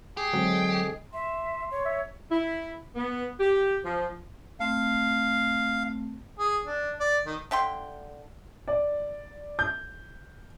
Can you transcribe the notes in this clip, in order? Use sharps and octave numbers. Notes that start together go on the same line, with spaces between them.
G4 G#4
D3 F#3 G#3 C4
E5 C6
C#5
E5
E4
B3
G4
F3
A3 C4 F5
G#4
D4
D5
D#3
D3 E5 G5 C6
D5
G6